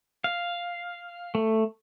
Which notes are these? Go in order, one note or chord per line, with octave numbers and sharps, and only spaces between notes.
F5
A3